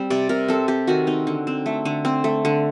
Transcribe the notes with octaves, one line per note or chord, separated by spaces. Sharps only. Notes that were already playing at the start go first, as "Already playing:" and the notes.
Already playing: G3 C4
C3 D5
C3 A#4
C4 A4
C4 G4
D#3 F#4
C4 D#4
D3
C4
A3
D3
C4
A3
D3